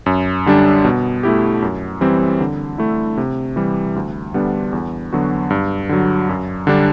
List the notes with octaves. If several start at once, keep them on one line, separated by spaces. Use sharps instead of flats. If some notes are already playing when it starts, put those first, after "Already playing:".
F#2
D3 G3 D4
B2
A3 E4 G4
F#2
E3 G3 C4
D3
A3 E4
C3
E3 G3
D2
D3 G3 B3 D4
E2
D3 F#3 B3 F#4
G2
D3 F#3
F#2
D3 G3 D4